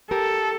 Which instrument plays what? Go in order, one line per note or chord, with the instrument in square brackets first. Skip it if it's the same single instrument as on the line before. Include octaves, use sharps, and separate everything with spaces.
[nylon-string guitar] G4 A#4 [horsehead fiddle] A4